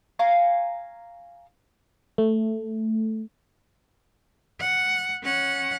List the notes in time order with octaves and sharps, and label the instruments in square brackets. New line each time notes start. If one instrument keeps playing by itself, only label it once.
[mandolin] F5 G#5 A#5 C#6
[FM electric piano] A3
[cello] F#5
C#4 F#5